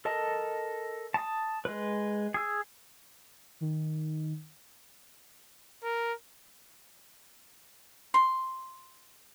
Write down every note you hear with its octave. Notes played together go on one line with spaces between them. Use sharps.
A4 A#4 D#5 A5
A5 D#6
G#3 B4
G#4 E6
D#3
A#4
C6